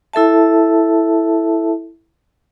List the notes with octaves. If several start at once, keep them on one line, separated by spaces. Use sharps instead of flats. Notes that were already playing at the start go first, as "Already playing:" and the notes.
E4 A4 E5 A5